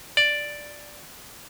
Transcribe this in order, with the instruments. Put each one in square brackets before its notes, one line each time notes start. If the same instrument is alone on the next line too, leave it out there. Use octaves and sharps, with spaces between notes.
[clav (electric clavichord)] D5